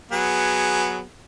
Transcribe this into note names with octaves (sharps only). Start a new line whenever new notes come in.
F#3 B3 G#4